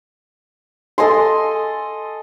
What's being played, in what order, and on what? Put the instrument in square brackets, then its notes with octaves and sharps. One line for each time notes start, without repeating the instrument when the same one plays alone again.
[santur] A4 D#5 G#5 C6